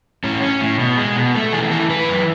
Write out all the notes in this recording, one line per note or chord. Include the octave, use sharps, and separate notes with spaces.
A2 C#4
C#4
A2
B2
G#3
B2
A3
E3 G#4
E3 A4
E3 B4
F#2